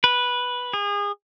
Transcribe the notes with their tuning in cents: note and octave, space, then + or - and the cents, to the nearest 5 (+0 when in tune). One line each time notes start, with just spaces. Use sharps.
B4 -10
G#4 -30